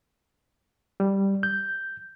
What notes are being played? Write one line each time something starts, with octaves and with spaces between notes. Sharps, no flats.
G3
G6